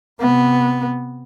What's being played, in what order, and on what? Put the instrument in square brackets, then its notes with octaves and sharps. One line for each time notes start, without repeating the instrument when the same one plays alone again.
[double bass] C3 B3